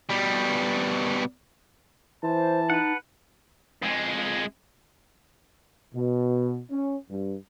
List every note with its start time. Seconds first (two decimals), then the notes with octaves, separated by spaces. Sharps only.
0.09 B2 G3
2.24 E3 C5 A5
2.70 D#4 B4 F#5
3.83 F2 G#3
5.94 B2
6.71 C#4
7.10 G2